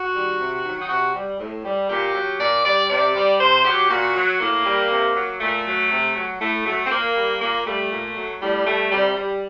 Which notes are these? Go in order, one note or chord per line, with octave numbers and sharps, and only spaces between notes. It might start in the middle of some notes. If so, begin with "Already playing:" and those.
Already playing: F#4
D#3 G3
C3
D#3 F#3
D#4
C3 F#4
G3
A2
G3
A#2 G4
F#3
A#2 D5
G3 D5
C3 D5
G3
C3 C5
F#3 G4
A#2 F#4
F#3
A2 A#3
G3
C3
F#3
A#2 A3
F#3
C3
F#3
A2 A3
F#3 A3
C4
A#2 A#3
G3
A#2 A#3
G3 A3
A#2
F#3
A2 G3
G3 A3
C3 G3
G3